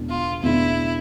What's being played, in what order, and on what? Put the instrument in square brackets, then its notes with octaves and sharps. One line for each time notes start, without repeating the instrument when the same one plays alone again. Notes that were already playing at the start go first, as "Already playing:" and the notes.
Already playing: [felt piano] E2 B2 G#3 D4
[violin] F4
[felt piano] E2 B2 G#3 D4 [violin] E4